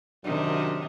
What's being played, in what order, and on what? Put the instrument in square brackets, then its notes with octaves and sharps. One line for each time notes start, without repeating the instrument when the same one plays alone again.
[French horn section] F#2 F#3 D4 [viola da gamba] C3 D#3